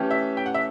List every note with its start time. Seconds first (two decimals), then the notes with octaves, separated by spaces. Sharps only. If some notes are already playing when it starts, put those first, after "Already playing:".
Already playing: E3 A3 C#4 G4
0.11 E5
0.37 G5
0.46 F#5
0.54 E5